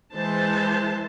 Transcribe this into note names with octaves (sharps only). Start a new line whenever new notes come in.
E3 G#3 C5 A5